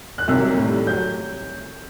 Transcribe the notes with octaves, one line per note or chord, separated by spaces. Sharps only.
F#6
C2 C3 D#3 F#3 E6
A2 G3
F#3 G6